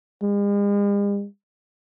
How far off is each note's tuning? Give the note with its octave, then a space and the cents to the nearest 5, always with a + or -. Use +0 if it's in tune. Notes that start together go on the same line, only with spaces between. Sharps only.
G#3 -45